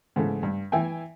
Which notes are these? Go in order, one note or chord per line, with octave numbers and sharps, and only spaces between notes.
G#2 C#3 E3 A3
G2
E3 E5 G5 G#5